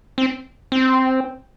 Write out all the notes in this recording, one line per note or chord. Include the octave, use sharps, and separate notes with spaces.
C4
C4